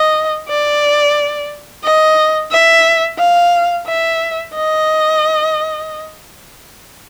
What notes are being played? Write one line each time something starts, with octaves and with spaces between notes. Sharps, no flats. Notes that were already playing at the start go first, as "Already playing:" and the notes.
Already playing: D#5
D5
D#5
E5
F5
E5
D#5